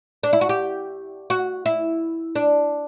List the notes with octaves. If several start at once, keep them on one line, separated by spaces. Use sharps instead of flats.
D4
E4
F#4
G4
F#4
E4
D4